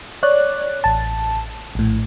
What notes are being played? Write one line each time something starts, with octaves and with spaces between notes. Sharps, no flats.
C#5 D5 F#6
A1 A5
A#1 A2